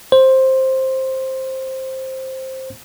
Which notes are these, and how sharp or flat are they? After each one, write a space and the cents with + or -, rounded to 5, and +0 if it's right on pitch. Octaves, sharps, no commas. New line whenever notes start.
C5 +10